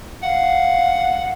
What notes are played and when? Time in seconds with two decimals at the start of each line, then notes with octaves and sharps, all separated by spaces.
0.23 F5 F#5